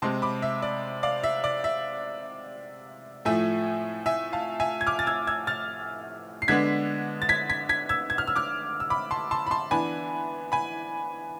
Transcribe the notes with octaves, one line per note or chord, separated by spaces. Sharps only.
C3 G#3 C4 A5 C6
B5 D6
E5
D5
D5 F5
E5
D5
E5
A2 F3 A3 E5 G#5
E5 G#5
F5 A5
E5 G#5
G#6
D6 F6
A6
E6 G#6
E6 G#6
F6 A6
C7
D3 G#3 B3 D4 G#6 B6
A6
G#6 B6
G#6 B6
G#6 B6
E6 G#6
G#6
F6
E6
D6 F6
E6
B5 D6
A5 C6
A5 C6
B5
A5 C6
E3 B3 D4 G#5 B5
G#5 B5